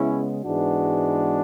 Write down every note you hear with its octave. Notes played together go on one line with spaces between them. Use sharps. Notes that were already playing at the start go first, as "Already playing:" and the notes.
Already playing: C#3 G#3 B3 C#4 E4
G#2 E3 G#3 B3 D4 F#4